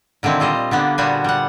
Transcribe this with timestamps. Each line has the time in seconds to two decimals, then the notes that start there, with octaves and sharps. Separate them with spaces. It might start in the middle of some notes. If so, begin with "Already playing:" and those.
0.23 A#2 D3 D#3 C4 E4
0.40 G3 F4 C5 D#5
0.71 D3 A#3 B3 D4
0.98 A#2 G3 B3 F#4 C5 G#5
1.24 G3 F#5